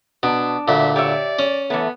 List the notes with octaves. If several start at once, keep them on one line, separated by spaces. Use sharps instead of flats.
B2 D4
D2 A#2 E5
G4 C#5 D5 E5
C#4
E3 A3 B3